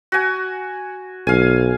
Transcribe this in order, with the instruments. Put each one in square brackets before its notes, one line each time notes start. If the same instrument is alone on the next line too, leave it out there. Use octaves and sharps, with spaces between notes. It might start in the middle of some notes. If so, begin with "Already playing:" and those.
[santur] F#4 G#5
[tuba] B1 [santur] F5 G#5